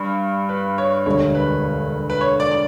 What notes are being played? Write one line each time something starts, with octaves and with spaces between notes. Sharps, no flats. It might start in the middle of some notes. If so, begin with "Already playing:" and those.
Already playing: G2
B4
C#5
E1 D2 D3 G3 C#5
B4
B4
C#5
D5
D5